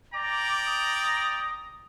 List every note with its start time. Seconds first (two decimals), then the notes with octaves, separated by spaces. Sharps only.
0.14 D5 G5 A#5 D6
0.66 D#6